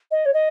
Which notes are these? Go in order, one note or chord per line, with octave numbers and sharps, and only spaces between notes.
D#5
C#5
D#5